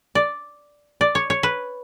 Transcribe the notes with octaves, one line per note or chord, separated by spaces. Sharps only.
D5
D5
C#5
C#5
B4